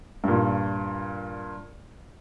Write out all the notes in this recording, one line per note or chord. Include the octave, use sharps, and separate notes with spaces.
G2 A#2